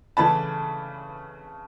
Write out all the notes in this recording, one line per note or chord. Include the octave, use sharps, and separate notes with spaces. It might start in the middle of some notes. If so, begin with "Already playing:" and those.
C#3 E3 A3 A5 B5